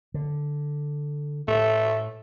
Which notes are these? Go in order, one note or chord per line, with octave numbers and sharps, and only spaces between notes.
D3
A2 A3